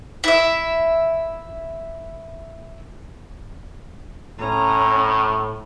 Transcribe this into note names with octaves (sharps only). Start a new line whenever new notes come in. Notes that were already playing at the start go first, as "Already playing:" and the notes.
E4 E5
A2 C#4 A#5